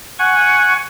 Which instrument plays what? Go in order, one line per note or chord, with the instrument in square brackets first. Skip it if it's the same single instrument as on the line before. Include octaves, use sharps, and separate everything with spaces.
[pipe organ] F#5 G#5 C#6